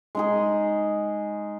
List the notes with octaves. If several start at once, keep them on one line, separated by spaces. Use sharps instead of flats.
G#3 D#4 G#4